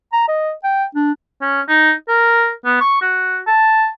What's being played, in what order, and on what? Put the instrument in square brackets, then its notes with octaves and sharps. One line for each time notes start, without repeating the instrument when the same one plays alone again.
[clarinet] A#5
D#5
G5
D4
[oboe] C#4
D#4
A#4
B3
C#6
F#4
A5